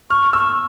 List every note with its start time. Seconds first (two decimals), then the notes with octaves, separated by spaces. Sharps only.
0.10 C#6 F6
0.33 C#6 E6